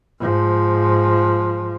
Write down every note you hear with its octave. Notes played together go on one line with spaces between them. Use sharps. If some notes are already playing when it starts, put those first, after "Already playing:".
G#2 F3